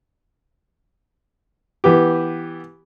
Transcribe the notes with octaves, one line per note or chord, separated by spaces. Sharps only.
E3 B3 G4